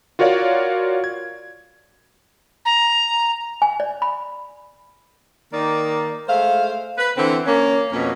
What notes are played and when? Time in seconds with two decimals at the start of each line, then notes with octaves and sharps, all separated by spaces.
0.19 F4 F#4 A#4 C#5 D5 F5
1.04 G#6
2.65 A#5
3.62 G#5
3.80 D5
4.02 B5
5.52 D#3 A#3 D#4 D5
6.28 G#3 A3 C5 F5
6.97 B4
7.17 D3 E3 C4
7.45 A#3 C#4
7.92 F2 B2 A#3 C#4